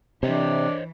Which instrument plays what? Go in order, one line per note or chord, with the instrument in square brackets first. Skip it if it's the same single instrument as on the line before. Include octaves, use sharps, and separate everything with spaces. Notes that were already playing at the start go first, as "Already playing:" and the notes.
[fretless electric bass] C3 [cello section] E3 [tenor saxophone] D4 [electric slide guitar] C5 C#5 D#5